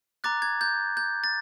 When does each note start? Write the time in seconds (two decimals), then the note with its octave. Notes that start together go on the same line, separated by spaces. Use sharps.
0.24 A#5 D6 F#6 A6
0.42 G#6
0.61 G6
0.97 G6
1.24 A6